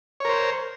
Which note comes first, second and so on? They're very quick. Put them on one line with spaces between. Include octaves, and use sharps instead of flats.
C#5 A#4 C5